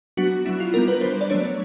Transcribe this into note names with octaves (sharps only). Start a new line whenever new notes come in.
F#3 B3 D4 F#4
F#3 B3 D4 E4
F4
G3 B3 D4 A#4
B4
G3 B3 D4 C5
D5
F#3 A3 D4 C#5